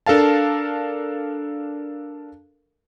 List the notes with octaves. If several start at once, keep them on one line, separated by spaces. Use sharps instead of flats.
D4 A4 A#4 F5 A5